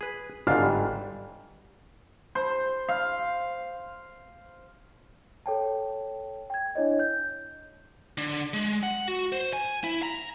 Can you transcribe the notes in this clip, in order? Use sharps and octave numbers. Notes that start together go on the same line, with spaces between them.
G#4 B4
G1 G#2 D3 D4 F5 F6
G3
C5
F5
A4 C#5 G5 A5
G5 G#6
D4 E4 C#5 D#5
G6
D3
G#3
F#5
F#4
C5
G#5
E4
A#5